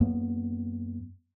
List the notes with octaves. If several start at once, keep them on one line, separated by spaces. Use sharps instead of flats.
F#2 A#3 B3